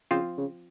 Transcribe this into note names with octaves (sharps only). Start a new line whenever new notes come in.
C#3 F3 C4 F4 C5
C#3